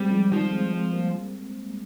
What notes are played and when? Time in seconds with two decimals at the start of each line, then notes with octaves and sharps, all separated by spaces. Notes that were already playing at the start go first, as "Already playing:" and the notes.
Already playing: G3 G#3 C4
0.11 F3 G#3
0.32 D#3 F3 G3
0.52 G#3 C4
0.73 G#3 C4
0.93 G3 A#3